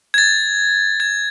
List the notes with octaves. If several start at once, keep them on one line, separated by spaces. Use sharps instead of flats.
G#6
A6
G#6